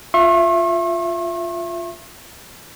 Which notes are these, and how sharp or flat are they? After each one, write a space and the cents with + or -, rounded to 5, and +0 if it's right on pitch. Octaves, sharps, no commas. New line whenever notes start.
F4 +0 E5 +20 C#6 -45